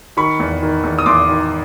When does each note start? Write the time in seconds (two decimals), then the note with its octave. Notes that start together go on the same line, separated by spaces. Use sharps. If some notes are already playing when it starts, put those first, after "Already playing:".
0.17 D#3 B5 C#6
0.40 E2
0.62 D#3
0.84 E2
0.99 D#6
1.06 E2 C6 D6
1.29 D#3